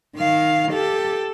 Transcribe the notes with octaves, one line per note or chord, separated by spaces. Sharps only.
D#3 F5
G4 A4